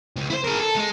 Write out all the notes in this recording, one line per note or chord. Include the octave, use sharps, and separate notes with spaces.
C#2
E4 C5
G#4 A#4
A4
G#3